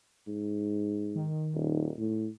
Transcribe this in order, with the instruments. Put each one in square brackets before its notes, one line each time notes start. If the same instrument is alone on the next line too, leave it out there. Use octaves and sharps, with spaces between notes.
[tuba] G#2
[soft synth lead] D#3
[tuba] D#1
A2